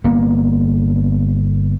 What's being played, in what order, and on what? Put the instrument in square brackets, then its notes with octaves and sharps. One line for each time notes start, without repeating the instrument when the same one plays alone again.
[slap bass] G1 A#3 B3